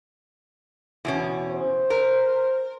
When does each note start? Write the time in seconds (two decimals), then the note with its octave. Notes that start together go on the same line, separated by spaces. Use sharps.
1.05 E2 B2 C#4
1.52 C5
1.90 A#4